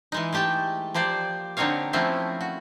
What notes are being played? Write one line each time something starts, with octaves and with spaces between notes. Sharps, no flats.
E3 G#3 D#4
G#3 A3 G4 G5 A5
F3 A#3 G4 C5 D5
D3 A#3 C4 D#4 C#5 F5
F3 A3 A#3 C4 C#4 E4
F#4